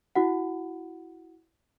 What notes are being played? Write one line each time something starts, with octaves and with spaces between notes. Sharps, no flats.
E4 F#4 F#5